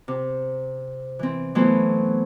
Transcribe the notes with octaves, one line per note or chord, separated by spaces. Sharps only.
C3
E3 C4
E3 F#3 A3 B3 C5